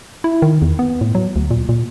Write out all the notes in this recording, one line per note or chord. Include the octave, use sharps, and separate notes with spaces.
E4
D#3
E2
B3
A2
F#3
D2
A#2
A#2